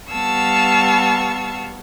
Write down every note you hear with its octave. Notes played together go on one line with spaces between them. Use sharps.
G3 B3 F5 A5 C#6 E6